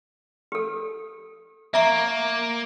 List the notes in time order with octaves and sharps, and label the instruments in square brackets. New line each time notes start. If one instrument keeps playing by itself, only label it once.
[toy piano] G4 A4
[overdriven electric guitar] A#3 [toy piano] E5 A#5 C#6